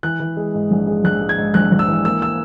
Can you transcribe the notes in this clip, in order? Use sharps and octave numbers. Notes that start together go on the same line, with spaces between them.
E3 F#6
E3
G#3
G#2
A#1
G#3
A#1 F#6
G#3
G#6
G#2
A#1 F#6
A#1
E6
E3
A#3 E6
E6